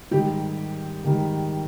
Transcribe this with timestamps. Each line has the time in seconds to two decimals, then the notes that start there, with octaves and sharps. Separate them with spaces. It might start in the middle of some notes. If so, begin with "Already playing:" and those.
0.11 G#2 D#3 G3 G4
1.04 G#2 D#3 G3